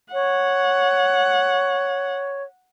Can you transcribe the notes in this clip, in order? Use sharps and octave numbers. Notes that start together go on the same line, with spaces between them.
C#5 F#5